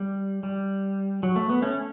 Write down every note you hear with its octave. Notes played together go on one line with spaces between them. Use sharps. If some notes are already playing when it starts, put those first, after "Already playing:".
Already playing: G3
G3
F#3
A3
B3
A3 C#4